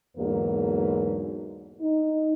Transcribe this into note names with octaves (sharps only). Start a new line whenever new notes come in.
E2 G#2 D3 F#3 A#3 B4
D#4